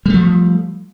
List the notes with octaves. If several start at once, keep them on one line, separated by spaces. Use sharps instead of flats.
F3 G3 A3